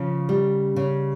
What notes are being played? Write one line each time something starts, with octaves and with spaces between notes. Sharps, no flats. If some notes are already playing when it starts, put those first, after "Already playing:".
Already playing: C#3 F3
G3
C#3